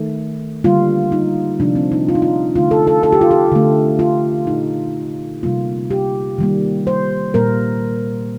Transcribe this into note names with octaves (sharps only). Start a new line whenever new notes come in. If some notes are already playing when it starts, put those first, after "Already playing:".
Already playing: D#3 A3
D3 G3 A#3 F4
D#4
C3 F3 A3 D4
C4
D#4
F4
D#4
F4
D3 A3 F4
A4
A4
A4
G4
F4
G4
D3 A3
F4
A#2 A3 D#4
C3 G3 A#3 F4
G4
D#3 G3 A#3
C5
A#2 G3 A#3 A#4